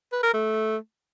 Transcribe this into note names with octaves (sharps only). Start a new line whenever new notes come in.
B4
A#4
A3